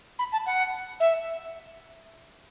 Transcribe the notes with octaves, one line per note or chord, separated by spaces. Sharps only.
B5
A5
F#5
E5